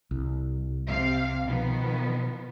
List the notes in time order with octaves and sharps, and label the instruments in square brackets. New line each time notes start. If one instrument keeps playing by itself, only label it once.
[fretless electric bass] C2
[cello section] C3 F5
[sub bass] B2 [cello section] D#3 F3 B3